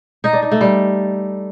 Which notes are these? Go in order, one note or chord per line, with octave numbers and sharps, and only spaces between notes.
D#4
D4
D#4
A3
G3